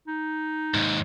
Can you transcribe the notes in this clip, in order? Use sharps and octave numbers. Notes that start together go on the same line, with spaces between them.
D#4
D#2 G#2